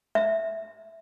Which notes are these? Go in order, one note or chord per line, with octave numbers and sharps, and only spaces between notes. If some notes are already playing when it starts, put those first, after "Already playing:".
E5